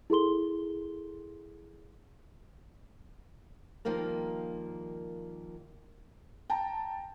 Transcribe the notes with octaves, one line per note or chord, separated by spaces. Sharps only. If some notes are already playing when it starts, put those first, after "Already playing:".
E4 G#4 A4 C6 G7
D#3 F3 G3 A#3 A#4
G5 A5 A#5